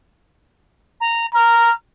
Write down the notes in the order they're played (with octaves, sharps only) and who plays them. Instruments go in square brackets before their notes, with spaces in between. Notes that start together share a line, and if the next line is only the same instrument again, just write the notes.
[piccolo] A#5
[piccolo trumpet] A#5 [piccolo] F6